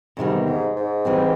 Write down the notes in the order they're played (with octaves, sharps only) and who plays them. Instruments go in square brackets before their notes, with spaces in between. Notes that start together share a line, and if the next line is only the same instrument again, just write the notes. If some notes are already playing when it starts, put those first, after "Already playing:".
[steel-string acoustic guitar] E2 C3 D#3 G3 [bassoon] G#2
[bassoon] G#2
G#2
[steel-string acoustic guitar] E3 G3 C4